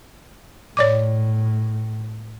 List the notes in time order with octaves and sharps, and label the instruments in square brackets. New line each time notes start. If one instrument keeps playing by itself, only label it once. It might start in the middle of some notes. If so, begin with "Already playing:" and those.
[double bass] A2 [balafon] C#5 D5 D6